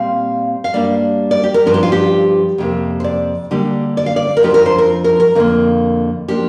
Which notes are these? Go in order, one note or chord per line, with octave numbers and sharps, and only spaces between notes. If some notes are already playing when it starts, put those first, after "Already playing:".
Already playing: A#2 G3 C4 F5
F5
G2 G3 A#3 D4 D5
D5
G4
A#4
G2 F3 D4 A#4
G4
F4
G4
F2 C3 A#3
C5
D5
D3 G3 A#3 D4 G4
D5
F5
D5
A#4
F2 F3 D4 G4
A#4
C5
A#4
A#4
A#4
F2 D3 A#3 A#4
F3 A#3 D4 G4